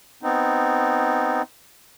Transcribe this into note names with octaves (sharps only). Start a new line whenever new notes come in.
B3 C4 D#4